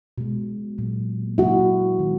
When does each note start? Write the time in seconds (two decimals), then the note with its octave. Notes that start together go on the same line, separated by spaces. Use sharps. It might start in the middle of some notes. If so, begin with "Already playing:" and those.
0.18 B2 G#3
0.78 A#2 F#3 A#3
1.38 C#3 F#3 A#3 E4 F#4
1.99 D#3 G#3